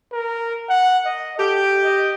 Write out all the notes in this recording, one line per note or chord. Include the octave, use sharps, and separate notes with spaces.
A#4
F#5
D#5
G4 A4
D#5